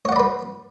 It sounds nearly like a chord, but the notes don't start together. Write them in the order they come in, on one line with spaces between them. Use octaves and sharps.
C#5 F#5 D5 B5 B4